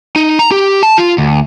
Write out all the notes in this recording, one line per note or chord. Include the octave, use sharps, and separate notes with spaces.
D#4
A#5
G4
A5
F4
D2